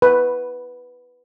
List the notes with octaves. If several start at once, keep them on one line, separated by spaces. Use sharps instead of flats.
B4